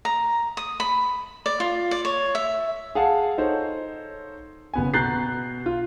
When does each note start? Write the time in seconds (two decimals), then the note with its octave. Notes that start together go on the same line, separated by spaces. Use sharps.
0.05 A#5
0.57 D#6
0.80 B5
1.46 D5
1.60 F4
1.91 D5
2.05 C#5
2.35 E5
2.95 G#4 F5 F#5 A5
3.38 D#4 A4 C5 C#5
4.73 F#1 B3 G#5
4.94 B2 A#5 F#6 G6 A6 C7
5.66 F4